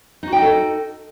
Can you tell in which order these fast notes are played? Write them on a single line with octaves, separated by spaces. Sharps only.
D#4 F#4 G5 D#5 A4